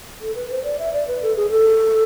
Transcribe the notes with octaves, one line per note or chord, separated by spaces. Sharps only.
A4
B4
C5
D5
E5
D5
B4
A4
G#4
A4